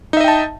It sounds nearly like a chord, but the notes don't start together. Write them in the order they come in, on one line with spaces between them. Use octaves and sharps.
D#4 E5 D#5 G5 A5